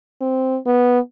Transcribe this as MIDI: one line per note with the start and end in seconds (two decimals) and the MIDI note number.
0.21 0.57 60
0.66 0.99 59